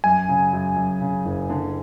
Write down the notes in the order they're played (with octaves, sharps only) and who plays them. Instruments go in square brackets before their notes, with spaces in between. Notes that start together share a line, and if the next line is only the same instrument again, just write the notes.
[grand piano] F#2 [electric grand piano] G#5
[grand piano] C#3
F#2
F#2
C#3
F#1
D3